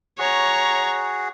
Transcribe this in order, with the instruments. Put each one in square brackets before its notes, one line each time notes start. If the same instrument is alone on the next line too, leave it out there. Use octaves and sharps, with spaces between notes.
[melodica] F#4 G#4 [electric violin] C#5 A#5